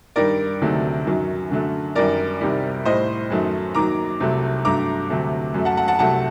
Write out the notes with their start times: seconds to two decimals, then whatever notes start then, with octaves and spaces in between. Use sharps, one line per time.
0.16 G2 D#3 G3 A#4 D5
0.61 D2 C3 D#3 F#3 A3
1.07 F#2 D#3 F#3
1.50 F#2 D3 F#3 A3
1.95 F#2 D#3 G3 A#4 D5
2.41 C2 C3 D#3 G3
2.85 A2 G3 C5 D#5
3.30 F#2 D#3 F#3 A3
3.75 D#2 D#3 F#3 A#5 D6
4.20 C2 C3 F#3 A3
4.65 G2 F#3 A3 A#5 D6
5.10 D2 C3 F#3 A3
5.54 F#2 F#3 A3
5.65 F#5 A5
5.77 F#5 A5
5.88 F#5 A5
5.99 C2 C3 F#3 A3 F#5 A5